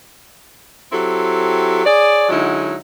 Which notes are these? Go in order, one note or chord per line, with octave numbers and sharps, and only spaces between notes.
F#3 C4 E4 G4 A4
G#4 C#5 D5
D3 F#3 G#3 D#4 E4